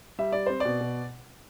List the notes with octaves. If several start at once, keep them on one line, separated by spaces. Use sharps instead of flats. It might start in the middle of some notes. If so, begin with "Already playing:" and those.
G3 E5
G3 D5
C4 C5
B2 D5
B2